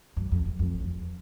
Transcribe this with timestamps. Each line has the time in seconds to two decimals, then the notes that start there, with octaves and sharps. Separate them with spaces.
0.17 F#2
0.31 F2
0.46 E2
0.59 F2
0.80 E2